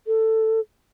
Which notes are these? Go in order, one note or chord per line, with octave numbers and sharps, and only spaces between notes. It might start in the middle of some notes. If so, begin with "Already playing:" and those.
A4